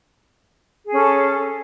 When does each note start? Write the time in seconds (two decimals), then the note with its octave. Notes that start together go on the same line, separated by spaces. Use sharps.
0.86 G#4
0.90 C#4
0.93 A4